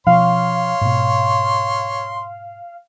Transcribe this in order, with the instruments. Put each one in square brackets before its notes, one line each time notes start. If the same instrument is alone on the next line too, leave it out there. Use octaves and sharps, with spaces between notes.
[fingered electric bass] B2 F3 C#4 [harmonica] C#5 C6 [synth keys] F5
[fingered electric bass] G#2 B2